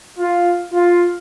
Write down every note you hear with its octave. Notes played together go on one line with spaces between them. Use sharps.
F4
F4